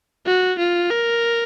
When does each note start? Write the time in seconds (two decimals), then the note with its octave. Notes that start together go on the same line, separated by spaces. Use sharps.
0.26 F#4
0.59 F4
0.91 A#4